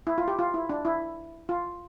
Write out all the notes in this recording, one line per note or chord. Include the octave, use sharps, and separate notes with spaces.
E4
F4
G4
F4
E4
D4
E4
F4